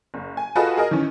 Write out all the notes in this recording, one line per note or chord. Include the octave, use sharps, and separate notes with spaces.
F#1
G#5
F4 F#4 G#4 A4 B4 D#5
G#4 A#4 D#5
D#3 E3 C#4